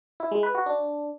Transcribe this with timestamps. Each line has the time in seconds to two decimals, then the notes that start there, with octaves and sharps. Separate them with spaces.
0.20 E4
0.32 G#3
0.43 B4
0.55 F#4
0.66 D4